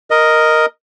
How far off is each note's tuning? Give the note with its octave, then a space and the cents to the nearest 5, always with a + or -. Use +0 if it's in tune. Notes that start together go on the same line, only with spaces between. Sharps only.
A#4 +0 D#5 +0